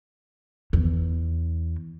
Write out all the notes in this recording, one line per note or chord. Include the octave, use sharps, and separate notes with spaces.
E2